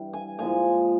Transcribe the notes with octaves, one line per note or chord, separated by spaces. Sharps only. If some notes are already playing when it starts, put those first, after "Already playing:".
Already playing: G2 E3 G3
G#5
A#2 F3 G#3 G#5